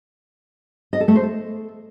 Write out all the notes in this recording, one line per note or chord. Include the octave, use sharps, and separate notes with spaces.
D#5
A4
A3
C5
A4